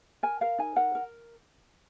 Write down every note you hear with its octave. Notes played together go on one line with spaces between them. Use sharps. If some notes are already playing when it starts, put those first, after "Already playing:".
A#4 G#5
A#4 F5
D#4 G#5
A#4 F#5
A#4